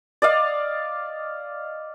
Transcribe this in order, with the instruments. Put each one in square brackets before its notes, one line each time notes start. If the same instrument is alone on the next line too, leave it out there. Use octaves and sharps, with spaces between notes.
[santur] D5 D#5 F5